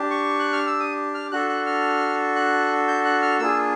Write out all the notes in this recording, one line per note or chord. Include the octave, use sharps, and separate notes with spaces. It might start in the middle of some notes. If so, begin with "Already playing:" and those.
Already playing: D4 G4
C#6
F#6
F6
E6
D#6
F6
D4 F#4 A4 F#6
F#6
F6
F#6
G6
F#6
F6
A#3 D4 F4 G#4 E6